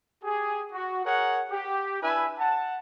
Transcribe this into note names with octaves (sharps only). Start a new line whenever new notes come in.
G4 G#4
F#4
G#4 A#4 C#5 F#5
G4
D4 E4 B4 E5 G#5
F#5 A5